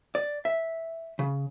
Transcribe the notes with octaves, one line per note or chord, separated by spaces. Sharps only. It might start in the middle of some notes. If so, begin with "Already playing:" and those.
D5
E5
C#3